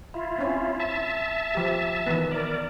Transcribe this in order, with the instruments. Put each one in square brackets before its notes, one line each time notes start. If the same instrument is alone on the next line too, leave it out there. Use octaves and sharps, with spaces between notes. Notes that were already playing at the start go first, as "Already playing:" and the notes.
[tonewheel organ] E4 F4
[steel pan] C4 C#4
[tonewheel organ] E5 A5
[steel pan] F3 G4
D#3 E3 B3
[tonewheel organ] A#4 D5